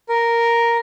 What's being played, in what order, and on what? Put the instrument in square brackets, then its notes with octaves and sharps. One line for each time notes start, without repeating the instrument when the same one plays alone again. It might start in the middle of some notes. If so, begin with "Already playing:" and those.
[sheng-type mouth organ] A#4